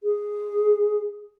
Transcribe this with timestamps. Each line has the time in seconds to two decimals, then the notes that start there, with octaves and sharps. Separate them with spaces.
0.03 G#4